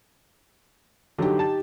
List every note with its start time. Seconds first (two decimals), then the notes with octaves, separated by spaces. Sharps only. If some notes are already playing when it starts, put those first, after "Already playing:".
1.18 D3 F#3 D#4 G4
1.39 A5